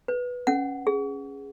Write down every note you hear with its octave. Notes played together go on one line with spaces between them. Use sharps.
B4
C#4 F#5
G#4